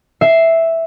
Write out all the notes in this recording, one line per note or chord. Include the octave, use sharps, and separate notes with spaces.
E5 C7